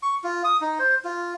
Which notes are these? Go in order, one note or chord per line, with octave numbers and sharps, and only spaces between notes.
C#6
F4
D#6
D#4
C5
F4